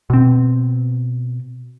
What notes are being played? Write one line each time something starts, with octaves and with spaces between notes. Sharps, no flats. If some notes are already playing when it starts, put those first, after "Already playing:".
B2 C4